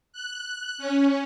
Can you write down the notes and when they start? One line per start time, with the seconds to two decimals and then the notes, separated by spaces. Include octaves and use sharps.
0.13 F#6
0.78 C#4